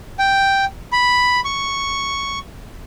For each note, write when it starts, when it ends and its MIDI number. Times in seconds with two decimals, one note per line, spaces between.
0.19 0.65 79
0.93 1.40 83
1.45 2.39 85